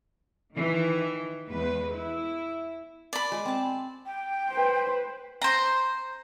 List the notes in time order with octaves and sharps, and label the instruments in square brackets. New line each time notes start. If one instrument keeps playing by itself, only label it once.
[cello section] D#3 E3
E2 G#3 B4
E4
[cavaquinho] D5 B5
[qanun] G#3 G#4
C4 A5
[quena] G5
[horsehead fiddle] B4 C5
[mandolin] C5 A#5